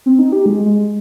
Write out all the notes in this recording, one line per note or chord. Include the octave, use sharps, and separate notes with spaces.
C4
D#4
G4
G#3
G#3